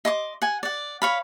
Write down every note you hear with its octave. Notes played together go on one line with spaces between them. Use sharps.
D#5 C6 D6
F#5 G#5
D5 F#5
C#5 F5 B5